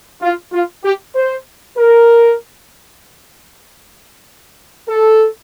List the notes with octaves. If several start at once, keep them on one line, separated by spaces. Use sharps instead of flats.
F4
F4
G4
C5
A#4
A4